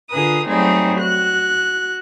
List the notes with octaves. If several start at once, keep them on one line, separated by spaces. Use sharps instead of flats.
D3 F4 G#4 A#4 B4 D#6
F#3 G3 A3 C4 D#4 G#4
F#4 F#6